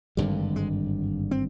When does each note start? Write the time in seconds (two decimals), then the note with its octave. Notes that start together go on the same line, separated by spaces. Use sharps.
0.17 G#1 G2 D3 G3
0.56 G#3
1.31 C4